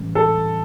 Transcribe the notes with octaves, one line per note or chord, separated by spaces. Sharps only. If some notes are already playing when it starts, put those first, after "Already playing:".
Already playing: A2 E3 G3 C#4
A4